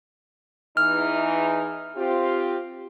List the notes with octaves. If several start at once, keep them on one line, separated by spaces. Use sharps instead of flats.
E2 E3 D#4 F6
C4 F4 G4